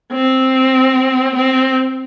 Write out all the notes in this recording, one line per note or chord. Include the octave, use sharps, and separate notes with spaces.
C4
C4